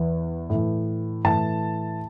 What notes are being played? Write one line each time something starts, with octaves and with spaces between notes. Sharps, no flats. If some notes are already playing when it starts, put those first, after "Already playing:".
Already playing: E2 E3
A2 E3
A2 E3 A5